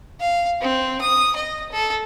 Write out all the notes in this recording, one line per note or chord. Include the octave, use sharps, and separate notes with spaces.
F5
C4
D#6
D#5
A4